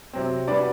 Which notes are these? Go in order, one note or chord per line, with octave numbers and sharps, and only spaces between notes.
C3 F#3 C4
G3 D4 F#4 B4 D5